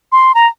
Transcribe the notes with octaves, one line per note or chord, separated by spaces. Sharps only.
C6
A#5